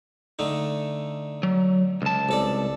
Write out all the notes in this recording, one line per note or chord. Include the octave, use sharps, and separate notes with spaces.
D3 A3 D#4
F#3
C#2 A5
C2 A4 D5